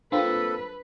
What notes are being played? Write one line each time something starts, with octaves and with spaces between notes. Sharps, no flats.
A#3 C4 D4 F4 A4 B4